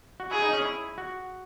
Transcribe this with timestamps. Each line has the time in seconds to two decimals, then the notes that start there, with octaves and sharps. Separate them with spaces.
0.20 F#4
0.31 E4 G#4
0.42 D#4
0.53 C#4
0.64 E4
0.98 F#4